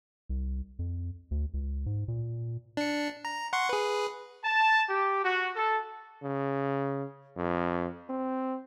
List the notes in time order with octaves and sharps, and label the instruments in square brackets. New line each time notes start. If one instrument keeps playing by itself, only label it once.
[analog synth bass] C2
F2
D2
C#2
G#2
A#2
[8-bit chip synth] D4 C#7
A#5
F#5 C6 C#6
G#4 B4
[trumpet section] A5
G4
F#4
A4
[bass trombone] C#3
F2
C4